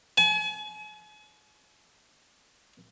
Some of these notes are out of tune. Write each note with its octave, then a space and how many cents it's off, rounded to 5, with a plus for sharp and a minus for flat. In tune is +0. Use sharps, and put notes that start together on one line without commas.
G#5 +40